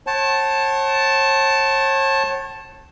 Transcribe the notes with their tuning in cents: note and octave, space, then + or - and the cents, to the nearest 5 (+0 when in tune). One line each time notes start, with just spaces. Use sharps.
C#5 -40 F#5 +45 A5 +0